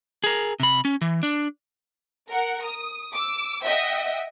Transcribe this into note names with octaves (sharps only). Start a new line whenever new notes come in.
G#4 A#4
C3 B5
C#4
E3
D4
A#4 F#5
D#6
D6 E6
D#5 E5 F#5 G5